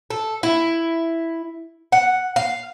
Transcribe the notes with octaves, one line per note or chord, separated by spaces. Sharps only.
A4
E4
F#5
F5